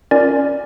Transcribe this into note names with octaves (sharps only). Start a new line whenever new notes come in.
C#4 F4 A#4 D5